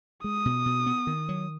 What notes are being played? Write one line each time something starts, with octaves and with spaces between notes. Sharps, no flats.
G#3 D#6
B2
B2
B3
D#3
F#3